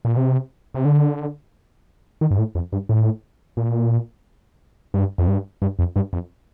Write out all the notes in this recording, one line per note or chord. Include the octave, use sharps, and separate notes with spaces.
A#2
C3
C3
D3
D#3
G2
A2
F2
G2
A2
A#2
G2
F2
G2
G2
F2
G2
F2